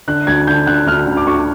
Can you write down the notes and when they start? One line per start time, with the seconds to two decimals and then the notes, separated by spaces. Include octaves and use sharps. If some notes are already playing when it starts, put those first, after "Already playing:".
0.08 D3 F#6
0.27 D2 G#6
0.47 D3 G6
0.67 D3 F#6
0.87 D2 F6
1.07 D2
1.17 D6
1.27 D2 C#6